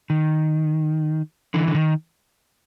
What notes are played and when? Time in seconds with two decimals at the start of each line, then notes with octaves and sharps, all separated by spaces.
0.10 D#3
1.54 D3 E3
1.68 D3
1.75 D#3